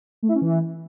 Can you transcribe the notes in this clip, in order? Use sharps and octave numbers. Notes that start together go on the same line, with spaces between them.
A3
E4
C#4
E3